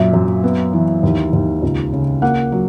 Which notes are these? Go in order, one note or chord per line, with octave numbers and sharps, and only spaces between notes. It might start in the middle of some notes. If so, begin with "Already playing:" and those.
Already playing: F#2 A#2 E5
F#2
B3
E3
D#2
D#2
C#2
C#3
A#3 F#5
F#3